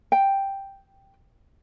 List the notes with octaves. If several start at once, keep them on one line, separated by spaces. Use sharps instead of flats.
G5